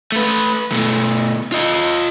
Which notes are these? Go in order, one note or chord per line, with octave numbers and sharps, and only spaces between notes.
A3 B4
B2 A3
F4 D#5